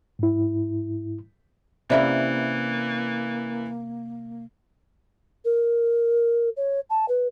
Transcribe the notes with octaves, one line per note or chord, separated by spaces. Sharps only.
G#2 E4
C3 E3 A#3 C#4 E4 A#4 D5 F5
A#4
C#5
A5
B4